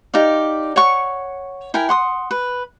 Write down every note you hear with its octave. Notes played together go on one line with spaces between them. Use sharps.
D#4 G4 D5 F5
C#5 F#5 C#6
E4 A#4 G5 G#5
F#5 C6 D#6
B4